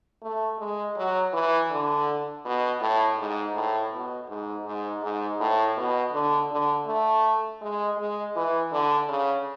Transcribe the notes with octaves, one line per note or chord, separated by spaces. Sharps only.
A3
G#3
F#3
E3
D3
B2
A2
G#2
A2
B2
G#2
G#2
G#2
A2
B2
D3
D3
A3
G#3
G#3
E3
D3
C#3